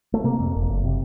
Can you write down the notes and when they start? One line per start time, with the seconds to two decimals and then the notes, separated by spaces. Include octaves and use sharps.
0.14 A3
0.24 C3 A#3
0.40 F2
0.55 F#1
0.69 F#1
0.84 C3